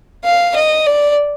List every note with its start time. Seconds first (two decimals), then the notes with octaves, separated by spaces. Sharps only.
0.24 F5
0.55 D#5
0.86 D5